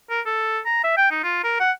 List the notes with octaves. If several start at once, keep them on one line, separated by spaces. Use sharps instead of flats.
A#4
A4
A#5
E5
G5
D#4
F4
A#4
F#5